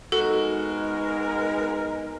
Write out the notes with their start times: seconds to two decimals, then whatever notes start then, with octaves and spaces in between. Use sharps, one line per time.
0.12 G#3 B3 D#4 F#4 A4 A#4